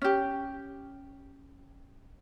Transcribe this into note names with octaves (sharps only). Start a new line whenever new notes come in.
C#4 G4